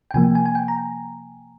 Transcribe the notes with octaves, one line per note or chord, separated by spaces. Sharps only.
G5
C3 F3 A#3 G#5
G#5
G#5
G5
A#5